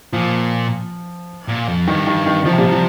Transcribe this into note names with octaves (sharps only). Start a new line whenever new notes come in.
A#2 F3
A#2
F2
G2 D#3
D#3
D#3
D#3 F3
C3
A#2 G3
C3
F3